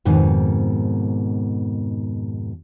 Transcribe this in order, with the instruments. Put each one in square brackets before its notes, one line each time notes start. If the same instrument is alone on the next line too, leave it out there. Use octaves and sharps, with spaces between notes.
[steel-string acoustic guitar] F2 G#2 B2 D#3